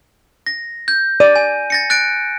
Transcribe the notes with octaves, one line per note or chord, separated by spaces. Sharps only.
A#6
G6
D5 D#7
G#5
A6 A#6 C#7
F#6 A6 D7